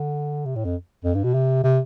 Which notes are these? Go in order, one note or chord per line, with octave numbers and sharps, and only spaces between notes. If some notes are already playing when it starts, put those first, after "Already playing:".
Already playing: D3
C3
A2
F2
F2
G2
B2
C3
C3